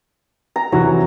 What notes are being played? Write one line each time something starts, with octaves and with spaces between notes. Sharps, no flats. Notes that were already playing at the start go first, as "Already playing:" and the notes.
A#5
F2 C3 E3 F#3